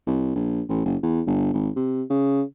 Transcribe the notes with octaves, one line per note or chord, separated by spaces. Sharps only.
C2
A#1
A1
F#1
E2
G1
G#1
C3
C#3